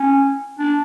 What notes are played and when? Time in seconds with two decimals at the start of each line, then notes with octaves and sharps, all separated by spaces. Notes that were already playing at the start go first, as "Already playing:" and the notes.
Already playing: C#4
0.59 D4